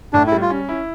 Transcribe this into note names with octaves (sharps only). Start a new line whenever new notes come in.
A2 D4
E4
G3
F4
C#4
E4